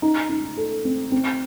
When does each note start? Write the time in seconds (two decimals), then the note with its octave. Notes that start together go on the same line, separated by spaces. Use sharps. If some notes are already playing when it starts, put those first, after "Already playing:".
0.02 D#4
0.29 D#4
0.57 A4
0.85 C4
1.12 C4